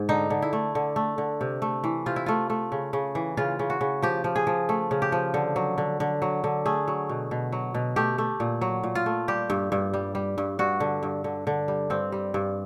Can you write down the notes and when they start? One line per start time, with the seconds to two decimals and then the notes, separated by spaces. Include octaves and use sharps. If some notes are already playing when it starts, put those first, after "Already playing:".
Already playing: G#2
0.09 D3 D#4
0.30 D3
0.42 E4
0.53 A3
0.75 D3
0.96 A3
1.18 D3
1.41 C3
1.62 A3
1.84 E3
2.06 C3 F4
2.16 E4
2.26 A3 F4
2.50 A3
2.72 C#3
2.93 C#3
3.15 E3
3.37 C#3 F4
3.59 C#3
3.70 F#4
3.81 C#3
4.02 F3 G4
4.24 F3
4.36 G#4
4.47 F3
4.69 A3
4.91 C#3
5.02 G4
5.12 F3
5.34 D3
5.56 F#3
5.78 D3
6.00 D3
6.22 F#3
6.44 D3
6.66 A3 G#4
6.88 F#3
7.09 B2
7.31 B2
7.52 F#3
7.74 B2
7.96 A3 G4
8.18 A3
8.40 A#2
8.61 F#3
8.83 A#2
8.95 F4
9.06 A3
9.28 G3 G4
9.50 G2
9.72 G2
9.94 G3
10.15 G3
10.38 G2
10.59 G2 F#4
10.80 D3
11.03 G2
11.24 D3
11.47 D3
11.68 G3
11.90 G2 C4
12.12 G3
12.34 G2